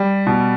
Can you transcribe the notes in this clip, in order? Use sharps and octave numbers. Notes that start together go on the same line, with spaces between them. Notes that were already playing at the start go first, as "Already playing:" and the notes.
Already playing: G3
B2